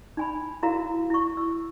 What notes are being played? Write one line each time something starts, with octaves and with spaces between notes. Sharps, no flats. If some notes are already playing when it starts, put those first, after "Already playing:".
D#4 G#5 B5
E4 F#4 A#4 F5 A#5
E4 C#6
E6